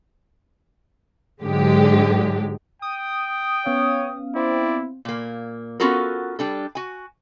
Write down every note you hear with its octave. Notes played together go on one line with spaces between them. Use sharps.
G#2 D3 F#3 G#3 G4
G5 D#6
B3 C#4 C#5 F5
C4 E4 D5
A#2 A#3
B3 C#4 F4 F#4 A4 A#4
G3 D4 A4
F#4 G#5